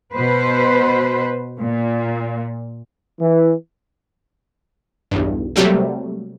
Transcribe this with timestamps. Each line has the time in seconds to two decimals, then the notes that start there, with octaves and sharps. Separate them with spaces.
0.14 B2 B4 C5
1.60 A#2
3.19 E3
5.11 B1 E2 G2
5.56 C3 F#3 G3 A3 A#3